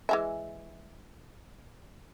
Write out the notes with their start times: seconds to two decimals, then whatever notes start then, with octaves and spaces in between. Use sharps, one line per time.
0.09 E3 G#3 E5